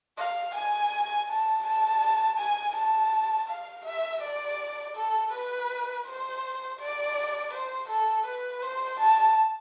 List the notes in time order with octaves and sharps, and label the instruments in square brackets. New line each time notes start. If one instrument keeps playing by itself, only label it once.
[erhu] F5
G#5
A5
A5
G#5
A5
F5
E5
D5
A4
B4
C5
D5
C5
A4
B4
C5
A5